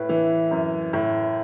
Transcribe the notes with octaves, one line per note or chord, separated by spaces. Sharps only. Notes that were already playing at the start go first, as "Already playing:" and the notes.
Already playing: A2 B4
E3
F#2
A2